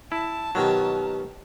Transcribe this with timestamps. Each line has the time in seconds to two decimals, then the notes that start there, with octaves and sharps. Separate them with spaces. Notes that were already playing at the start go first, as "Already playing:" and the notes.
0.12 E4 A5
0.55 B2 D#3 F#3 F4 G4 A#4